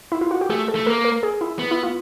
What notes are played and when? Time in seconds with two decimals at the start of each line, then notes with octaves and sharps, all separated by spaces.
0.12 E4
0.21 F4
0.31 F#4
0.41 G4
0.50 A3 G#4
0.68 A4
0.75 A3
0.86 A#3 A#4
1.05 A#4
1.23 G#4
1.41 E4
1.59 B3
1.71 E4
1.83 F4